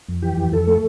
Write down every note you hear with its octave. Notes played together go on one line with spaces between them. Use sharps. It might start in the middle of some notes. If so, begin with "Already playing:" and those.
F2
E3 G4
F2
F2 A4
A3